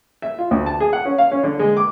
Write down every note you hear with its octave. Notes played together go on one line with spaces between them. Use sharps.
E5
F4
D2
A5
G#4
F#5
C#4
F5
C#4
D3
G#3
D6